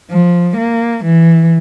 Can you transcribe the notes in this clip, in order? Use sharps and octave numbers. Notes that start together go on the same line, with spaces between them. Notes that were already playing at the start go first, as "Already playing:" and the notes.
F3
A#3
E3